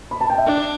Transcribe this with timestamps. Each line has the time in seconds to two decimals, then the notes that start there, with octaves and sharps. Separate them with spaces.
0.11 B5
0.21 A5
0.30 G5
0.38 E5
0.47 D4 D5